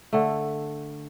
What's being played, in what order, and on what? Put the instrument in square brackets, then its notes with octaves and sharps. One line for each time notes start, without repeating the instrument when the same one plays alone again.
[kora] D3 A3